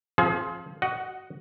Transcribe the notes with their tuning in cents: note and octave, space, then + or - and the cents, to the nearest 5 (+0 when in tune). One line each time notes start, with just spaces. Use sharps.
F3 +0 C4 +35 G#4 +35
F#4 +25 D#5 +0 F#5 +0